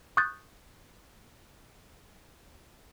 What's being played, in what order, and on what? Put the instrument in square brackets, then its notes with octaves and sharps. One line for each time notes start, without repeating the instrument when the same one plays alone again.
[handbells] C#6 D#6 F#6 G6 A6